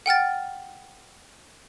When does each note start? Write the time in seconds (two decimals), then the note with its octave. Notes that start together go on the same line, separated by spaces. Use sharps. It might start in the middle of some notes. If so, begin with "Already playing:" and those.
0.06 F#5 G5 F6 A6